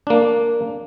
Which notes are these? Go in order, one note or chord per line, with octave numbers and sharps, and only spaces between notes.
A#3 D4